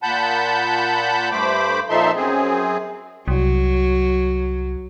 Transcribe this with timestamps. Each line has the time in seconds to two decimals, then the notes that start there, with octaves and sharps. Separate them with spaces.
0.03 A#2 F#5 A5 B5 G6
1.31 G2 A3 C5 B5 D6
1.89 A#2 F3 D#4 A4 E5 C6
2.16 F#2 C4 G#4
3.28 C2 F#3